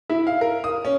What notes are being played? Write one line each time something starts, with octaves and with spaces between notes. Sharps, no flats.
E4
F5
A#4
D#6
C#4